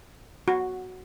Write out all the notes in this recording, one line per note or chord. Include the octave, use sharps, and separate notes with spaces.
F#4